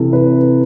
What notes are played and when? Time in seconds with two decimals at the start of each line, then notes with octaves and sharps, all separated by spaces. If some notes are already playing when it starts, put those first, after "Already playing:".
Already playing: C3 E3 A4
0.13 B4